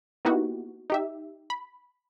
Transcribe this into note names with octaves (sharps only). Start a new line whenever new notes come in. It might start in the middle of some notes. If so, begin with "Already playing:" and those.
A#3 B3 D#4 E4 F#4 G4
D#4 G4 E5
B5